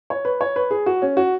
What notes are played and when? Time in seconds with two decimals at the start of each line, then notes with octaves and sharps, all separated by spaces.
0.10 C#5
0.25 B4
0.41 C#5
0.56 B4
0.71 G#4
0.86 F#4
1.02 C#4
1.17 F#4